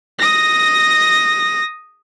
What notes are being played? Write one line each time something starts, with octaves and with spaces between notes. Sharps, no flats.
D#6 A#6